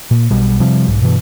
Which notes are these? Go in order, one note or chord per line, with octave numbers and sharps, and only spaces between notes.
A#2
B1 B2 G3
C3 F3 G3
B1 G#2
G2 B2 E3